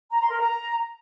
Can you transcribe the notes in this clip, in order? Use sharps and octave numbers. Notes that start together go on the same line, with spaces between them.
A#5
C6
A#4
A#5